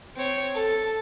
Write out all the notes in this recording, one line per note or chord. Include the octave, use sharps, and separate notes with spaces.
C4 C#5
A4 A5